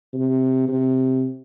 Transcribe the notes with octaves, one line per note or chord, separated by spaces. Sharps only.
C3
C3